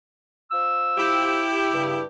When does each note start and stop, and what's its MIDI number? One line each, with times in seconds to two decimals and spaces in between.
0.52 1.58 65
0.52 1.58 72
0.52 1.58 88
0.97 2.02 64
0.97 2.02 67
1.72 2.02 43
1.72 2.02 49